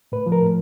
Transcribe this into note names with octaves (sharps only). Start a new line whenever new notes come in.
A2 B4
F3
A#4
A2